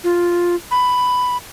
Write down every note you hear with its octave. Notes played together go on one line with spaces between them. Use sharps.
F4
B5